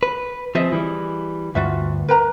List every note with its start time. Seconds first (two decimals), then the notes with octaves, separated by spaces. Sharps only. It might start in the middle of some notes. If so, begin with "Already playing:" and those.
0.03 B4
0.55 F3 C4 G#4 D#5 E5
0.73 E3 G3
1.55 D2 G2 F4 F#4 E5
2.08 A#4 B4 A#5